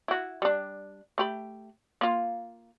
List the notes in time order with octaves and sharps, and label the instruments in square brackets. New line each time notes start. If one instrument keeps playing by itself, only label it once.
[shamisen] E4 F#4
G3 D4
A3 G4 B5
A#3 F4